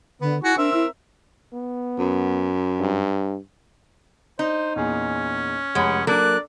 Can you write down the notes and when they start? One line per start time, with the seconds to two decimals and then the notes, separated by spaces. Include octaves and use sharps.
0.21 D3 B3
0.43 E4 F#4 G#4 C#6
0.57 C4 D4 A#4 E5
0.73 E4
1.53 B3
1.99 F#2
2.80 G2
4.39 D#4 C5
4.76 E2 A#2 C#4 G#4
5.75 F1 G#3 C#5 F#5 B5
6.07 F#3 A#3 D4 A4 A#4 D5 F#6